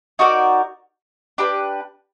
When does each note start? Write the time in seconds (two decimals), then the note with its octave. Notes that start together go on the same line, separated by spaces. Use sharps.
0.19 D#4 F#4 A#4 D5
1.38 D4 G4 B4